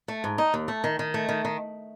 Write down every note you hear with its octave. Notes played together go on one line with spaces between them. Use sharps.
A3
G#2
D#4
D#2
A3
D#3
D#3
A3
D#3
D#3